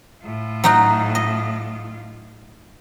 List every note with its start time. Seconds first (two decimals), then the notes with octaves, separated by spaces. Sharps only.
0.24 A2 F4
0.64 F#3 D#4 F#4
1.15 D#5